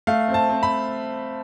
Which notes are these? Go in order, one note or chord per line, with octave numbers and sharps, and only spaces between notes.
A3 F5
C4
A5
C4
B5